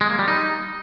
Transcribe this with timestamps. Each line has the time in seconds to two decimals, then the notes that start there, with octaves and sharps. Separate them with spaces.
0.01 G#3
0.10 A#3
0.19 G3
0.28 D#4